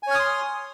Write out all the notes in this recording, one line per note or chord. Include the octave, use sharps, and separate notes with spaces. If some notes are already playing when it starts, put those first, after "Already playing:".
C#5 G#5 C6 D#6 F6